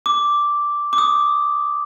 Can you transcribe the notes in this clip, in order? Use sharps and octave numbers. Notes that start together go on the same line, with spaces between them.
D6
D6
D#6